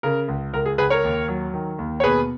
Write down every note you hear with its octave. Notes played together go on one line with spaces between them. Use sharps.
C#3 A#4
C#2
C#2 A#4
G#4
C#2 G#4 B4
A#4 C#5
D#2
F#3
D#3
D#2
C#5
B2 G#4 B4